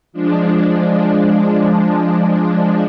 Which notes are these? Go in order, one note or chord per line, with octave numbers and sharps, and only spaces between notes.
F3 G#3 D4